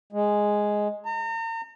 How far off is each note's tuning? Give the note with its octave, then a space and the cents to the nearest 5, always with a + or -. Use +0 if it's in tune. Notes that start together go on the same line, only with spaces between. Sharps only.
G#3 +0
A#5 -40